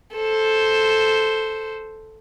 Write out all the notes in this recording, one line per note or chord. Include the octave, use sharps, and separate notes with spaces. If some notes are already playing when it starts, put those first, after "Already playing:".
A4 C5